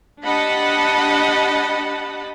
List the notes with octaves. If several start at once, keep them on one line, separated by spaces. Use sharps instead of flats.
D4 G4 D#5 F#5 A5 B5